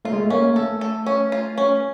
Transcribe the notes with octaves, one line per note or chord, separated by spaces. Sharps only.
A3 F4
G#3
A3
A#3 C#4
A3 A4
A4
C#4
F4
C#4